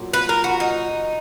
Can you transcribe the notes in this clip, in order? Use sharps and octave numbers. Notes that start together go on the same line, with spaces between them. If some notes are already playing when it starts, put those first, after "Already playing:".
Already playing: A#2 F#3
B4
A#4
F#4
D#4